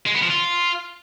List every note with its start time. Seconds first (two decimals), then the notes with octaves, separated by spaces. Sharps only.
0.06 G#3
0.14 B3
0.22 F3
0.30 F4